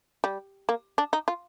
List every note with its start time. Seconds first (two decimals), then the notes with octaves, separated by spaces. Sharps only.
0.24 G3
0.69 A#3
0.98 D4
1.13 D#4
1.28 F4